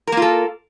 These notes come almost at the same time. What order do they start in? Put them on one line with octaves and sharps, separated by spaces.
A#4 A#3 F4 A4